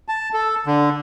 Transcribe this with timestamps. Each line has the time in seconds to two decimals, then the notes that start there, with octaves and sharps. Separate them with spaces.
0.08 A5
0.34 A4
0.66 D3